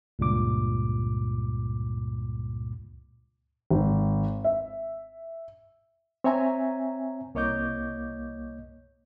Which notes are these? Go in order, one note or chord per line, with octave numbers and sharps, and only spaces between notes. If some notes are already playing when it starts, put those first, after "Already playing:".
C#2 G2 A#2 D6
G#1
E5
C4 C#5 E5 G#5 A#5
C2 A#3 C#5 D#5 D6 G6